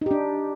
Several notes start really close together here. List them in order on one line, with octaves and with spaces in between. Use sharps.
D#4 G4 D4